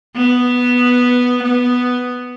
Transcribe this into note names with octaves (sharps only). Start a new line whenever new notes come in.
B3
B3